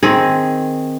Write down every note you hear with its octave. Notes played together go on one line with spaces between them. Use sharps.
D#3 C4 G#4